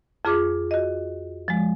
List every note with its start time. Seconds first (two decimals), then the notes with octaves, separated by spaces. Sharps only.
0.25 F2 F4 G#4 D6
0.71 F#4 D#5
1.48 F3 G#3